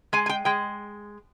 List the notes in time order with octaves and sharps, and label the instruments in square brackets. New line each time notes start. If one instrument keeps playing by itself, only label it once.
[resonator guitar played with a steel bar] G#3 G#5
G#5
G5
G#3 G5